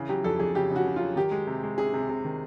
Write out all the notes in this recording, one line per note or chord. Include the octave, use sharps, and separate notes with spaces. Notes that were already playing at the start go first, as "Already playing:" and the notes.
Already playing: C#3 E3
F#3 G4
F2 A4
F2 G#4
C#3 G4
C#3
F#4
C#3
F#3 F4
D#3 G4
G#3
C3
G#3
C3 G#4
C3
C3
D#3